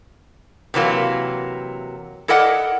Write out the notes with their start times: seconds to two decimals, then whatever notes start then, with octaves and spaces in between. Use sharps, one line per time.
0.74 C3 E3 F#3 A#3
2.28 E4 A4 A#4 D5 D#5 F#5